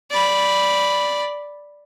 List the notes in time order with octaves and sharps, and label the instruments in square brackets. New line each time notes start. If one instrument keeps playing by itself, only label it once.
[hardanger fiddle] D5 B5